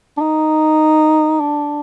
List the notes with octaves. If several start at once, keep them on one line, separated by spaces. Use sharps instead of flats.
D4
D#4
D4